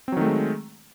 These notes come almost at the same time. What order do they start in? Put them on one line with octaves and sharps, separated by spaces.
C4 F#3 D#3 A3 G#3